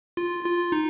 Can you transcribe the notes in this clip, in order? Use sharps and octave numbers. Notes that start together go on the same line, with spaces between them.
F4
F4
D#4